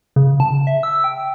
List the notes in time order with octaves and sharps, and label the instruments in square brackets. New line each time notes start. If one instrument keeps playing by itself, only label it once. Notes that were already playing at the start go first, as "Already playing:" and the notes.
[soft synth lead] C#3
A5
E5
E6
G5